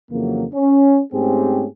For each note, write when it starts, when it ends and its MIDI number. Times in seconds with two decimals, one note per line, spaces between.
0.11 0.45 41
0.11 0.45 49
0.11 0.45 52
0.11 0.45 54
0.11 0.45 58
0.53 1.01 61
1.13 1.66 44
1.13 1.66 57
1.13 1.66 60
1.13 1.66 61
1.13 1.66 67
1.13 1.66 68